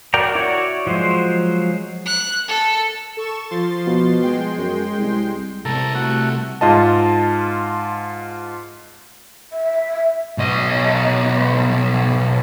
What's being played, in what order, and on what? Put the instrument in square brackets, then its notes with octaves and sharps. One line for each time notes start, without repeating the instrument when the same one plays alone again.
[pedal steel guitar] F#4 A#4 D5 G5 A#5
E4 F#4 C#5 D5
F3 F#3 G#3 C5
[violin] F#6
A4
[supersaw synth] A4 C#6 E7
F3 C6 A6
[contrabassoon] B2
[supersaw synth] G#3 G5 C6
[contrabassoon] F#2
C2
[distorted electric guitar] C2 C3 [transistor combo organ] A4 A#5
[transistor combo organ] A3 F#4
[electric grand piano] G#2 F4 D#5 A5
[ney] E5
[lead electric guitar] B1 D#5